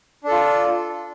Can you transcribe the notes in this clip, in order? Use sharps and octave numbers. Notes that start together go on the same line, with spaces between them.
D4 F4 A4